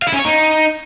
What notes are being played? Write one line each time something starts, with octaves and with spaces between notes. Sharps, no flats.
F5
E4
C#4
C#5
D#4